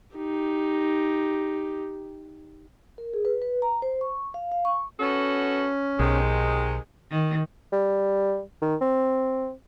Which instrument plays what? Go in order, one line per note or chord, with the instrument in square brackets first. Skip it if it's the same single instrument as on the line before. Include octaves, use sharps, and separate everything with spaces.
[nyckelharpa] D#4 G4
[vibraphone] A#4
G#4
B4
B4
A#5
C5
C#6
F5
F5
C#6
[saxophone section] B3 F#4 A4 [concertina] C#4
[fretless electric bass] B1 [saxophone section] C3 D#3 G#3
[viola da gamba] D#3
[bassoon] G3
D#3
C4